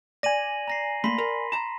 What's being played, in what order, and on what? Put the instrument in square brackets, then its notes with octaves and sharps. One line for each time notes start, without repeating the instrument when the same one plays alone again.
[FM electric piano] D5 G#5 [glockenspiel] A#6 D#7 F#7
[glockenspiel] A#5 A#6 C7
[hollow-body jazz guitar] A3 A#3 [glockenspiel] B5 C6 B6
[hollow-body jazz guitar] A#4
A5 A#5